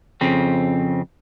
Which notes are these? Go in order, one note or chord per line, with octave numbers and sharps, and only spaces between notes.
F2 C#3 C4